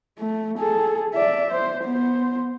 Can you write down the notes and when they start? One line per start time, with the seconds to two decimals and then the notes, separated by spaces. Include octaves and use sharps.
0.19 A3
0.58 G#4 A4
1.14 D5 E5
1.51 C5
1.84 B3 C5